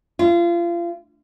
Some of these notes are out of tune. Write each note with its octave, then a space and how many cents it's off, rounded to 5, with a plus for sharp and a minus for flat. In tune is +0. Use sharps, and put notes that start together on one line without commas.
F4 -30